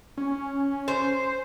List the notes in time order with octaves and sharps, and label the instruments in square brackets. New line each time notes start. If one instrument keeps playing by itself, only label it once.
[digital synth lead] C#4
[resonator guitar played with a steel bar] C5